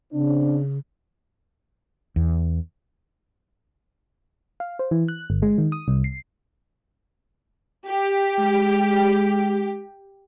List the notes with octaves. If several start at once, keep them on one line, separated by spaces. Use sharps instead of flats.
C#3 C4 D4
E2
F5
C5
E3
F#6
G1
G#3
D#3
D#6
C2
C7
G4
G#3